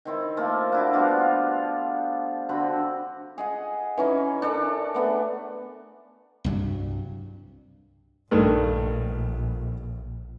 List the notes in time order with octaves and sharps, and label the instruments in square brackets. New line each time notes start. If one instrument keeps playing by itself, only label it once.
[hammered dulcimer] D#3 C4 E4
F3 A3 A#3 F4
D4 E4 F#4
F3 G3 B3 F4
F5
D3 C4 F#4 B5
G#4 D#5 F#5
E3 C#4 D#4
D4 A4 A#4 C#5
A3 B3 G#4
[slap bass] C2 G2 F#3
[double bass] A#1 [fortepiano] G2 D#3 A3